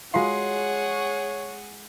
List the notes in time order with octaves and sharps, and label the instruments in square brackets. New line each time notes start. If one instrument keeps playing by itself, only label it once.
[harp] G#3 C6 [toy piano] F4 F#4 F5 [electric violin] G#4 F#5 [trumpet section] C#5